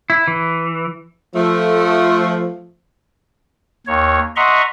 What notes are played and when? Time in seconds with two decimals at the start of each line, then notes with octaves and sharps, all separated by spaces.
0.10 E4
0.28 E3
1.35 F3 A3
3.87 D#2 C#5
4.36 D#5 E5 F#5 A#5 C6 C#6